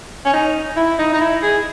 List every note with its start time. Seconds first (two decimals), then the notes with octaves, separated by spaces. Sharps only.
0.25 C#4
0.33 D#4
0.77 E4
0.99 D#4
1.13 D#4
1.21 E4
1.43 G#4